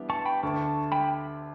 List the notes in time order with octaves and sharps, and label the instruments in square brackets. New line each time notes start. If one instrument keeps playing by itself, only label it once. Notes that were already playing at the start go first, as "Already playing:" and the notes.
Already playing: [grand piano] E3 G3 B3 D4 G4
[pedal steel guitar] A5 C#6
G5 B5
[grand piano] D2 D3 A3 D4 [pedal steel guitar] A5 C#6
[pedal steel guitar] G5 B5